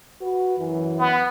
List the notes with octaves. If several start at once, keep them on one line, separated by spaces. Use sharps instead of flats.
F#4 B4
F#2 E3
B3